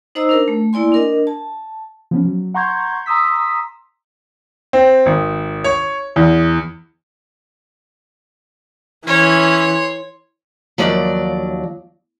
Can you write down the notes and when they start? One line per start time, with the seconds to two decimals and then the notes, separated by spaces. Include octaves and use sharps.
0.15 D#4 C5 D#5 A#5 E6
0.29 D4 A#4
0.48 A3
0.73 A#3 E4 D5 G#5 C6
0.92 D4 A#4 D#5
1.27 A5
2.11 F3 B3 C#4
2.25 F#3
2.54 F#5 A#5 C6 C#6 G6 G#6
3.06 A#5 C6 D#6 E6 B6
4.73 C4
5.06 G#1
5.64 C#5
6.16 E2
9.07 E3 C#4 C#5 C6
10.78 D#2 F3 F#3 D5